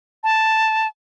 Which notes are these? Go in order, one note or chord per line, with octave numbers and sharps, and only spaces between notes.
A5